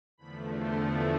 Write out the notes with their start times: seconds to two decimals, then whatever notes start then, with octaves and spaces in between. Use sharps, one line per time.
0.18 E2 D3 F3 A3 B5
0.57 C6